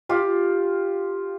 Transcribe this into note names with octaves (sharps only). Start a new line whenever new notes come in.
F4 G4